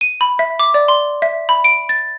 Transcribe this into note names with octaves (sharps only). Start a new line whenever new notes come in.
D#7
B5
E5
D6
D5
C6
E5
B5
D7
A6